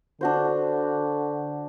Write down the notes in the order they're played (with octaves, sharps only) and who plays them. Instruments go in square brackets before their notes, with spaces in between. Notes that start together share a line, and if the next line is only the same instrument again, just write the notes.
[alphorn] D3 [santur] D4 F#4 C5